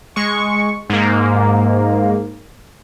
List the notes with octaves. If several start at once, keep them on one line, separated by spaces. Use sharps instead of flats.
G#3 C#6
G#2 A#3